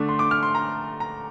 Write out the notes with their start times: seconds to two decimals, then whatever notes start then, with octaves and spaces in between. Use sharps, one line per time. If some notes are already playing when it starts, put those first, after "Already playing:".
Already playing: D3 A3 D4
0.09 C6
0.19 D6
0.31 F6
0.43 C6
0.55 A#5
1.00 A#5